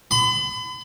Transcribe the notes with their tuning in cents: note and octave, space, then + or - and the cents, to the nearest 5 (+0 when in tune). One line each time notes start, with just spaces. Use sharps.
B5 +40